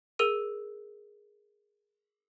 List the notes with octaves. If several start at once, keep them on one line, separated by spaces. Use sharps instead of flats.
G#4 A#4 E6 D#7